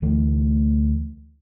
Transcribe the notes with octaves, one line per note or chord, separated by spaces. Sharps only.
D2 E3 A3